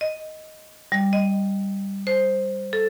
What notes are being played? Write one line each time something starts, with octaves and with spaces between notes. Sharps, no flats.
D#5
G3
D#5
C5
A4